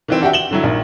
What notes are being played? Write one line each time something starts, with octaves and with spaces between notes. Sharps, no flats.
D#3 E3 C4
D4 F#4 G4 E5 G5
E7 F#7 G7
D3 F#3 E4
A#1 A#2 D#3